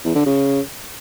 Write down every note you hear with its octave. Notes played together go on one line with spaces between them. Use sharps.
E2
D3
C#3